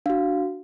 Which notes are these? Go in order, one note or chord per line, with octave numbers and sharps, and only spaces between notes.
D4 F#4 F5